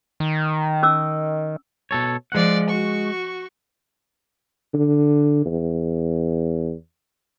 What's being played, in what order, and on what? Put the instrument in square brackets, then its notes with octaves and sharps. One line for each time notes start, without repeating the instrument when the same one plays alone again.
[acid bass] D#3
[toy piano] C#4 D6 E6
[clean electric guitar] B2 A4 C#5
[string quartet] F3 D5 [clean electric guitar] G#3 F#5
[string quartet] F#4 C#6
[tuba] D3
E2